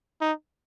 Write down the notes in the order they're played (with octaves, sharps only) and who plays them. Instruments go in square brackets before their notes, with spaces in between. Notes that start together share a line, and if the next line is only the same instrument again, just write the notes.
[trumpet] D#4